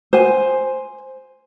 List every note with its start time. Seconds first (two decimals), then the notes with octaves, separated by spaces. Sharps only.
0.13 C5 G#5